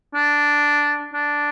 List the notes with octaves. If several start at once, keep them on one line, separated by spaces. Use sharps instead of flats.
D4
D4